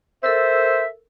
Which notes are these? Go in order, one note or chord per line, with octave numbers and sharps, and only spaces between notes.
A4 A#4 C5 E5 E6